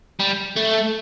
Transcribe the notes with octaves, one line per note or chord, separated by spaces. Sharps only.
G3
A3